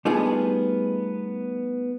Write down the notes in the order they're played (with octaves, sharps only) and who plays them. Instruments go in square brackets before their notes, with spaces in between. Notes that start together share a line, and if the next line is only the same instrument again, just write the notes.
[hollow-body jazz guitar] G3 A3 B3 D#4 F4 G#4